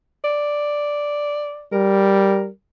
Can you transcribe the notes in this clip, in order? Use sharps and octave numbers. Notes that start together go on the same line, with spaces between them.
D5
G3 A#4